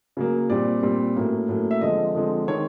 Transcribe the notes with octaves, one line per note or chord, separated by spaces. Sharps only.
C#3 F#3 A#3
A#2 G3 C4 D5
A#2 G3 C4
A2 F#3 A#3 C#4
A2 F#3 A#3 C#4
E5
D3 F3 G#3 C4 D#5
D3 F3 G#3 C4
D#3 G#3 C4 C#5